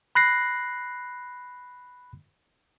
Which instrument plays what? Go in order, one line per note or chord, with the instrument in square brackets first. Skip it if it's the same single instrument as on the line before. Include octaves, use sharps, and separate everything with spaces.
[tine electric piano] B5 F#6 A#6 C7